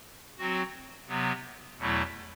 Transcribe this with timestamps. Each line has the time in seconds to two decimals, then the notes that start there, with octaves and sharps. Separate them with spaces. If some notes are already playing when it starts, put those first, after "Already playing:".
0.38 F#3 C4 F#4
1.08 C3 F#3 B3
1.78 E2 B2 F#3 A3 E4